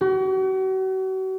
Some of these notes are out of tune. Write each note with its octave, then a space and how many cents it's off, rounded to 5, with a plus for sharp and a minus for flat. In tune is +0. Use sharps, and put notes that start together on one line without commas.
F#4 +40